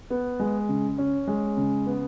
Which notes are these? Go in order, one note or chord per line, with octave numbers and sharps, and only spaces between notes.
B3
G#3
C#3
C#4
G#3
C#3
B3